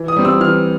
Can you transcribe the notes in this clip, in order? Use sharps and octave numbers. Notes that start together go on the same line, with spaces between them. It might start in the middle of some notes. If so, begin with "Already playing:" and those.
Already playing: E3
D#6
G3 C4
E6
E3 F6